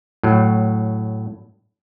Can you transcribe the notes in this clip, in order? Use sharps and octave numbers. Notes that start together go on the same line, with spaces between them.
A2 F#3